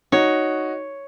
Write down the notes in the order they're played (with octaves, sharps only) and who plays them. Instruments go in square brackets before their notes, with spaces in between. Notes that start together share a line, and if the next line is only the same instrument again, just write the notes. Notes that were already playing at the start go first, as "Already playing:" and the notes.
[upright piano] D#4 F#4 [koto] C#5